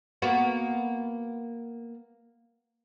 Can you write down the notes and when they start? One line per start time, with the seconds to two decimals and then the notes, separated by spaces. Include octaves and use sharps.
0.22 A#3 B3 F#4